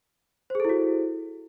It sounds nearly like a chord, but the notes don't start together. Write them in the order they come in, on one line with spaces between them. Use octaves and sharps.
C5 G#4 A4 E4 F#4